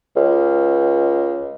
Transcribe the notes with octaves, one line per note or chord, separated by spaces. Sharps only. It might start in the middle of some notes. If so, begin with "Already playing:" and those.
C#2